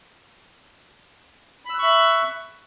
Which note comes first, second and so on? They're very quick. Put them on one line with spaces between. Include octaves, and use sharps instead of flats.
B5 E6 F#6 C#6 E5